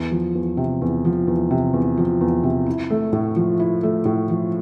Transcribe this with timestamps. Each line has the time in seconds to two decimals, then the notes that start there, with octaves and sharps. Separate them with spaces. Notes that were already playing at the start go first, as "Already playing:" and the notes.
Already playing: E2
0.12 F3
0.35 E2
0.57 C3
0.82 E2
1.05 F3
1.28 E2
1.51 C3
1.73 E2
1.97 F3
2.21 E2
2.44 C3
2.66 E4
2.90 A3
3.13 A2
3.36 F3
3.60 E4
3.83 A3
4.05 A2
4.30 F3